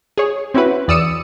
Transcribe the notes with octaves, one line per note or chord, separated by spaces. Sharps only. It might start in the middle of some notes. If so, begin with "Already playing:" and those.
G#4 C#5
C4 C#4 E4 F#4 B4
E2 D5 D#6 E6 C#7 D#7